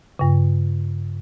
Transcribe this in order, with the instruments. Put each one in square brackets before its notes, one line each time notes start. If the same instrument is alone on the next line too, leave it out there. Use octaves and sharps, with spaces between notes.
[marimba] G2 C#3